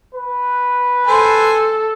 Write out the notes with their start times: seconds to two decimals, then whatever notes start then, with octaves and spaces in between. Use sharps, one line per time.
0.15 B4
1.07 A4 C5 G#5